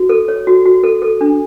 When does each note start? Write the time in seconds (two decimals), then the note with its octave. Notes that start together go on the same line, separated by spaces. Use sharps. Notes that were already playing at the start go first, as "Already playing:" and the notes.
Already playing: F#4
0.09 A4
0.28 C#5
0.47 F#4
0.65 F#4
0.84 A4
1.02 A4
1.21 D4